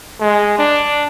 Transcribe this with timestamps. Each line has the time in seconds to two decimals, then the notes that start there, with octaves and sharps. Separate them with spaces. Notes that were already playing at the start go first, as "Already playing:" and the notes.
0.20 G#3
0.59 D4